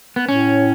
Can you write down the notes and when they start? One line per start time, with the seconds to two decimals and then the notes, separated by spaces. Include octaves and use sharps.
0.16 B3
0.28 A2 C#4